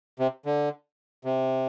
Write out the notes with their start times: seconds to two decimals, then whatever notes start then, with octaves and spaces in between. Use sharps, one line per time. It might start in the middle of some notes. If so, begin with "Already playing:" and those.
0.19 C3
0.45 D3
1.25 C3